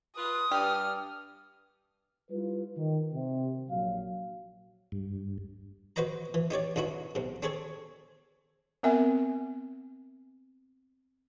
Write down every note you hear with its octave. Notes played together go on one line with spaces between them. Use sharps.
F4 B4 D#6
G2 G4 F6
G3 E4 F4 B4
D#3
C3
A#1 F#3 F5
G2
F#4 B4 C5 D#5 A#5
E3
D#4 G4 C#5 D5
C2 G2 D#4 E4 F#4
B1 C3
C4 C#4 G#4 A4 C#5
B3 C4 A#4 E5 G#5